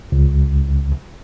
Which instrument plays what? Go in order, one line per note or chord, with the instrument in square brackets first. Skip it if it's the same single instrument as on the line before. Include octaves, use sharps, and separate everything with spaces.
[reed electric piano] C#2